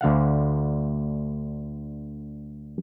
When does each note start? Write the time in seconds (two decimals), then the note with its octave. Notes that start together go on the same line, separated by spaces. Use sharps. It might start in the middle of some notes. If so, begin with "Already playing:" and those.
0.01 D2 D3 F5 F#5